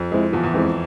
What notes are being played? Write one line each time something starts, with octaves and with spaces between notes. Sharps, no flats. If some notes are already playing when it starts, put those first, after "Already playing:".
Already playing: F2
G#3 C4 E4
E2 F3
E2
F2 G#3 C4 E4